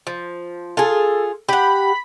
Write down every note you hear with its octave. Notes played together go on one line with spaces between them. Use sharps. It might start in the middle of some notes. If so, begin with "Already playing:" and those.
F3
F4 G#4 A4
G4 F#5 B5